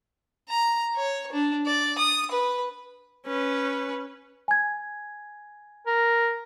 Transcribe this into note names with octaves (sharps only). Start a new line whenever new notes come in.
A#5
C#5
D4
D5
D#6
B4
C#4 B4
G#5 G#6
A#4